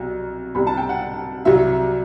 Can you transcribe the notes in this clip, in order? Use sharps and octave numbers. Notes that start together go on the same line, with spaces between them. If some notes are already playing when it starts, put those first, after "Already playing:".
Already playing: C2 B2 F#3
C2 B2 G3 B5
A5
G5
F#5
C2 C3 F#3 E5